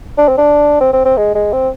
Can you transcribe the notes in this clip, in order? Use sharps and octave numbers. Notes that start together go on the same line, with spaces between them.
D4
C4
D4
C4
C4
C4
G#3
G#3
C4